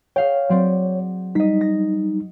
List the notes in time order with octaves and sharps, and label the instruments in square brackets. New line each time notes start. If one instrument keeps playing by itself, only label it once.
[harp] G#4 F5 G5 [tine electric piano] C#5
[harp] F#3 C4 D5
[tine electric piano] G3 D#4 [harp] D#5 B6
[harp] A#6